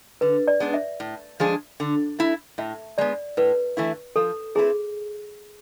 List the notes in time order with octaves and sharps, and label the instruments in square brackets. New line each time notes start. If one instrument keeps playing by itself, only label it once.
[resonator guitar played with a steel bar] D3 [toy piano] B4
[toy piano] D5
[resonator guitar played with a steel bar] G#3 B3 D4
[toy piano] E5
[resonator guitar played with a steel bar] A2
F3 G#3 D4 G#4
D3
A3 E4
[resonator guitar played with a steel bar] A2 [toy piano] E5
[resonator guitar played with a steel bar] G#3 B3 [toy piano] D5
[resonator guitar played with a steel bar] A2 [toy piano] B4
[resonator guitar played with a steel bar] E3 A3 E4
[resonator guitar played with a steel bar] F3 [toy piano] A4
[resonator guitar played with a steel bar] A3 C4 E4 B4 [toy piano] G#4